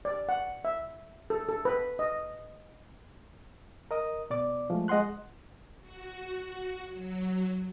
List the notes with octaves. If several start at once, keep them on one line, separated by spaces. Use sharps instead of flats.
D5
F#5
E5
A4
A4
B4
D#5
A#4 D#5 D#6
B2 D5 D6
F3 G#3 A3
G#3 D#5 F#5 C6 F#6
F#4
F#3